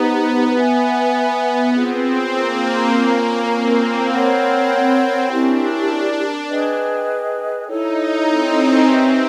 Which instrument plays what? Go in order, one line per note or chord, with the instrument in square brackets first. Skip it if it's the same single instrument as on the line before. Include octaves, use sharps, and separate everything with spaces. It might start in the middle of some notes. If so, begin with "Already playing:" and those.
Already playing: [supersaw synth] B3 [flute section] D#4 G4 C5
[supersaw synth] B3 [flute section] B4 E5 G#5 B5
[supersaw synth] C4 [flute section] C#4 F4 G#4
[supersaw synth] A#3
[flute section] C#4 F4 A#4
[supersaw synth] C4
[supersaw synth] C4 [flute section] A#4 C#5 F#5 B5
[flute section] C#4 E4 G4 A#4 [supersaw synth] D4
[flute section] G#4 B4 D#5 G5
[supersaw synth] D#4 [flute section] E4 A4 C#5
[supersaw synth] C4
C#4
[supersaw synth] C4 [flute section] D#4 G4 B4 E5